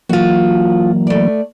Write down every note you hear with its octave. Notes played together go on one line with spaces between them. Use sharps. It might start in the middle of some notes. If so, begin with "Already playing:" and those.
E3 F#3 A#3 F4 F#4
A3 D5